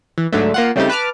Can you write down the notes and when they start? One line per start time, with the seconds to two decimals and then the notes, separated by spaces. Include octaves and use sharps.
0.18 E3
0.33 G#2 D3 F#3 A3
0.54 A#3 F4 F#5
0.76 C#3 G3 A3 C4 D#4 G4
0.89 B4 A5 D6 F6